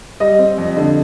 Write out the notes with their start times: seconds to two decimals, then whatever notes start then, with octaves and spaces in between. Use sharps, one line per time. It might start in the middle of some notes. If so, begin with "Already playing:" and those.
0.20 G3 D#5
0.39 C4
0.58 F2
0.77 D3